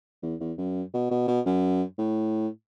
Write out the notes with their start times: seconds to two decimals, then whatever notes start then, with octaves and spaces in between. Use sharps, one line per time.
0.23 E2
0.40 E2
0.58 F#2
0.94 B2
1.11 B2
1.28 B2
1.46 F#2
1.98 A2